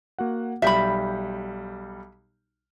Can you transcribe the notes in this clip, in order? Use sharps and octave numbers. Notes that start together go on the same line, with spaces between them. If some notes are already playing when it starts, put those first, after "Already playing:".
A#3 F#4 F#5
B1 G3 E5 B5 G6